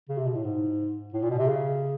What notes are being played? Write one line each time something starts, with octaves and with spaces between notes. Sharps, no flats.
C#3
C3
B2
A2
G#2
A2
A#2
B2
C3
C#3